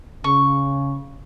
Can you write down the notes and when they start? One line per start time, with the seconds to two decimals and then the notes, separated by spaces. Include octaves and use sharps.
0.24 C#3 C#6